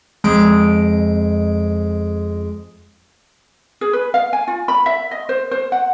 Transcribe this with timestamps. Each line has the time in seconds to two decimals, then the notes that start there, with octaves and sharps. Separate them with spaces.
0.24 F2 G#3 D7
3.81 G#4
3.93 B4
4.14 F5
4.33 G#5
4.48 F4
4.68 B5
4.86 E5
5.11 D#5
5.29 C5
5.51 C5
5.72 F#5